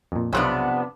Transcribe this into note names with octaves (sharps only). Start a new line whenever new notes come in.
F2 A#2
B1 F2 C3 B3 D4 C#5